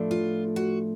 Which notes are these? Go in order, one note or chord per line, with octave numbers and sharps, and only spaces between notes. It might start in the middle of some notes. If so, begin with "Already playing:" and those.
Already playing: A2 F3 A3 D4
F4
F#4